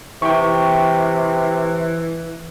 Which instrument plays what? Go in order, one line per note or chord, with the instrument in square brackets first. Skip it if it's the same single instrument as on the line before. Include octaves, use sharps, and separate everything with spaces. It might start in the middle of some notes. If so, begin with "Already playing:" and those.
[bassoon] C3 [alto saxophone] E3 [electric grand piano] G5 C#6